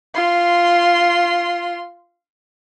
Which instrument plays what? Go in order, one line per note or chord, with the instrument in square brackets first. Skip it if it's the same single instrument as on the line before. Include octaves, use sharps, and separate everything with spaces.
[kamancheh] F4 C6